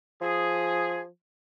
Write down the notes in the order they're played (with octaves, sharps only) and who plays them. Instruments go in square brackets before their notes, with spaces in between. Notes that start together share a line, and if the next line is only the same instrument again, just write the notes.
[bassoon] F3 [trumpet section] G#4